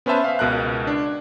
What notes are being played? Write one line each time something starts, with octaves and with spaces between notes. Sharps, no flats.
B3 C#4 B4 C5 E5 A5
E5 F5
C#2 B2 A#4 A#5 F#6
D4